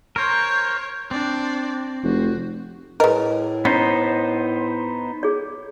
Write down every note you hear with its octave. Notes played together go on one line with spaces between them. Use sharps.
A#4 C5 C#5
C4 D4 D5
F1 F#4
A2 G#3 A#4 B4 D#5
B3 C#4 D#4 C5
G#4 C#5